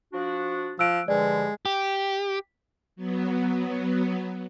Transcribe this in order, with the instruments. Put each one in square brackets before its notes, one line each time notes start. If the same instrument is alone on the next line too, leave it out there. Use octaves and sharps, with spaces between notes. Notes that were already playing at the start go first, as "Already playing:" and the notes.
[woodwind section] F3 D4 F#4
[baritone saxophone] F3 [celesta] E6 F#6 D7
[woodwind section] G2 D3 F3 [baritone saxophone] G#3 [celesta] D5
[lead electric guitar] G4
[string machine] F#3 B3